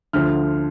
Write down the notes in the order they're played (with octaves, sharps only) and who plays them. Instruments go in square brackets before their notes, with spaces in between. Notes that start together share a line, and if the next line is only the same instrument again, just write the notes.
[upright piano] D2 D3 F3 F6